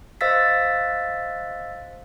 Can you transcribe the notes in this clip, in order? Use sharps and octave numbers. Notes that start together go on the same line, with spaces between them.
C5 D#5 F5 E6 A6 B6